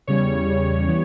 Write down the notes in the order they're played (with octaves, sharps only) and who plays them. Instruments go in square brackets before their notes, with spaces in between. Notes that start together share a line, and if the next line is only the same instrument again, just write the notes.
[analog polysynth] E2 C#3 G3 C#5
E3 G3 B3